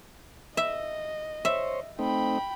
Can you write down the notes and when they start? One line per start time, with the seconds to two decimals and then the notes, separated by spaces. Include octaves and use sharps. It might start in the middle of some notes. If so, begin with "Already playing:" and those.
0.57 D#5 E5
1.45 C5 C#5 E5
1.99 A3 C4 D#4 G5 B5